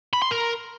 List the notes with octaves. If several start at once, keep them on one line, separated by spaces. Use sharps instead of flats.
B5
C6
A#4